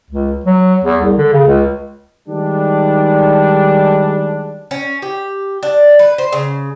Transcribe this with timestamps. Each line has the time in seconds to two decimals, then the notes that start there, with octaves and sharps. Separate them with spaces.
0.10 C#2
0.45 F#3
0.85 E2
1.02 C2
1.18 D3
1.33 C#3
1.47 C#2
2.28 D#3 G3 G#3 D4
4.71 C#4
5.02 G4
5.63 D4
5.99 B4
6.18 C5
6.33 C#3